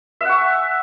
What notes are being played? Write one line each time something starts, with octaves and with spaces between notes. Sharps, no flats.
E5 F#5 C#6